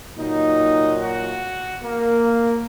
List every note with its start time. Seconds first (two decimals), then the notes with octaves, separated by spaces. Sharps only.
0.18 A#2 F#3 D#4
1.00 F#4
1.83 A#3